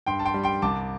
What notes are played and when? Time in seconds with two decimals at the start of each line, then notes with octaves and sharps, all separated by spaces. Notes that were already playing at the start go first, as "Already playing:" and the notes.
0.06 G2 G5 C6
0.19 A5
0.25 G5 C6
0.34 G3
0.43 G5 C6
0.62 C2 A5 D6